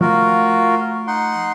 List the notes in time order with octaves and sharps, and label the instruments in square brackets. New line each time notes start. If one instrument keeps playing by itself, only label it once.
[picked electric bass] F3 A3 [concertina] F4 F#4 A#4
[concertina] D#4 F#5 C6